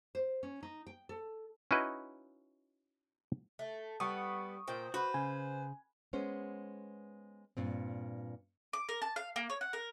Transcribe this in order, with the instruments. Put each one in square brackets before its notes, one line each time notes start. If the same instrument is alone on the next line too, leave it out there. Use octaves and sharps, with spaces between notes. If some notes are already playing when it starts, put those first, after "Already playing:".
[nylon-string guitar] C5
C#4
D#4
G5
A4
[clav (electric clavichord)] C#4 D#4 E4 F#4 B4 D#5
[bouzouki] A3
[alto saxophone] G3 [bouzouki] B3 [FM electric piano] C#6 D#6
[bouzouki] A#2 G5 [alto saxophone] C5
[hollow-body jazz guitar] F#4 [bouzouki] B4 [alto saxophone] C5
[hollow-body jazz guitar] C#3 [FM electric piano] G#5
[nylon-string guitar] G#3 B3 C#4 C5
G2 A#2 C4
[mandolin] D6
A#4
A5
F5
A#3
C#5
F#5
A#4